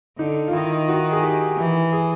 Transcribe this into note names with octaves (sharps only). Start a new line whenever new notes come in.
D3 D#4
F4
D#3 E4
F#4
G#4
G4
E3
G#4